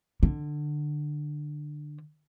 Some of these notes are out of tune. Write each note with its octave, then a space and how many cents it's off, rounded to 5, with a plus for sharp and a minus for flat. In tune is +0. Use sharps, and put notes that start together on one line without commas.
D3 +20